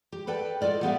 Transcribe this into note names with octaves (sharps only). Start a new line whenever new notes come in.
G4
A4 B4 D5 G5 A5
F4 A4 D5 D#5
G3 A#3 B3 G4 E5 F5